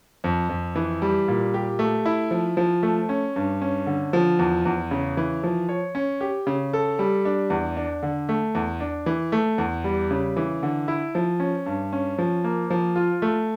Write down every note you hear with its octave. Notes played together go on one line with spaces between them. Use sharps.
F2
F2
E3
G3
A#2
G4
A3
E4
F3
F3
A3
C#4
G2
C#4
D3
F3
E2
E2
C#3
E3
F3
C#5
C#4
G4
C#3
A4
G3
D4
E2
D4
D3
A3
E2
D4
E3
A3
E2
G3
C#3
E3
D3
E4
F3
C#4
G2
C#4
F3
A#3
F3
F4
A3